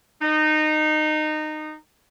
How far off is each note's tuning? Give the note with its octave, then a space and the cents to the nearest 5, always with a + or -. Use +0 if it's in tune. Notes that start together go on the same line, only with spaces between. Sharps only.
D#4 -20